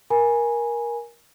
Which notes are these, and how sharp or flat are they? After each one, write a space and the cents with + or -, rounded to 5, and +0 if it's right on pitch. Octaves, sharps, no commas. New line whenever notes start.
A#4 +15 G#5 +0 B5 -45